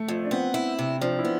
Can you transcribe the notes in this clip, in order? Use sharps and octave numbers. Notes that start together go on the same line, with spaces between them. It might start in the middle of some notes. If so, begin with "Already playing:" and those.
Already playing: A3
F2
D4
B3 C4
E4
C3
F3 D4
E4
B3